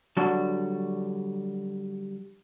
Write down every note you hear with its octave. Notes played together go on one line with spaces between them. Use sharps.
D3 F#3 G3 D4 F#4 A5